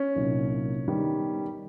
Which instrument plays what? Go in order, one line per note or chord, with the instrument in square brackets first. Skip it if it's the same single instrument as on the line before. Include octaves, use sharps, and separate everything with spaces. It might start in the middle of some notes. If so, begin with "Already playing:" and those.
Already playing: [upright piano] C#4
[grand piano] C2 A#2 F#3 A#3 D#4
D#3 G3 B3